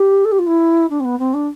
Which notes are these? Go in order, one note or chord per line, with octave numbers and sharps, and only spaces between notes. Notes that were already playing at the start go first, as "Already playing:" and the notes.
Already playing: G4
A4
G4
F4
E4
D4
C4
B3
C4
D4